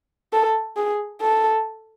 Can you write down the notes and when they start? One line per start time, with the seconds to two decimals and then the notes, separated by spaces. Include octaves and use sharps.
0.33 A4
0.77 G#4
1.22 A4